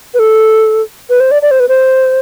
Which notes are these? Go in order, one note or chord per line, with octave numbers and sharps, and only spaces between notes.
B4
A4
B4
C5
D5
D5
C5
B4
C5